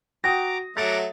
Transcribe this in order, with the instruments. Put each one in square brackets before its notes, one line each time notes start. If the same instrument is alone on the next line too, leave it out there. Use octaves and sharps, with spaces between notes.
[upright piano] F#4 G5 D#6 [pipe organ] A#5 D6 [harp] A#6
[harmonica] F#3 A3 [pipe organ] F#5 A#5 D6 [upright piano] A6